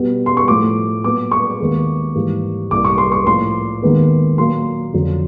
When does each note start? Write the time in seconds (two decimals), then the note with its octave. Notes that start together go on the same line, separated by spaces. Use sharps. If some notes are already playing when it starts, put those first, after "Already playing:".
Already playing: B2 G3 B3
0.26 C6
0.37 C#6
0.48 A2 F3 A3 D6
1.04 A#2 F#3 B3 D6
1.32 C#6
1.59 D#2 D#3 G#3 B3
2.15 G#2 E3 G3 A#3
2.71 C2 A#2 G3 A#3 D6
2.85 C#6
2.98 C6
3.12 C#6
3.27 A2 F3 A#3 C6
3.82 D#2 D#3 G#3 B3
4.38 A#2 F#3 A#3 C6
4.94 F2 D3 F#3